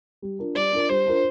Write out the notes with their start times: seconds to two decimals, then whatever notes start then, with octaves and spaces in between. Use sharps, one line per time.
0.22 G3
0.39 D4 F4 A#4
0.55 G3 D5
0.72 D4 F4 A#4
0.89 G3 C5
1.06 D4 F4 A#4